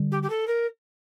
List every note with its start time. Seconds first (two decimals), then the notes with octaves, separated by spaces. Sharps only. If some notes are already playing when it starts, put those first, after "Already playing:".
Already playing: D3 G3
0.12 G4
0.23 G4
0.30 A4
0.47 A#4